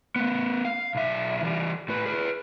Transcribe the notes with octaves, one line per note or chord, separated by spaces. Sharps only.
A3 B3
F5
B1 E5
E3 G3
A2 B4
G#4 B4